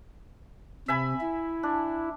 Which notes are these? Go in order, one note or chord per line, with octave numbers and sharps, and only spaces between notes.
C3 E5 G#5 B5
E4
D4